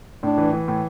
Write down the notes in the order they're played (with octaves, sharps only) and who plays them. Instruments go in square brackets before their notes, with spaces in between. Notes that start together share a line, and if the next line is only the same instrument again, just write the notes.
[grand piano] A2 [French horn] D4
[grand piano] E3
E3
A2